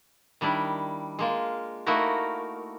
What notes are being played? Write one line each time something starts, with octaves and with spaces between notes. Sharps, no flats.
D#3 G3 D4 E4
G#3 A#3 F4
A3 A#3 D#4 E4 F#4 A#4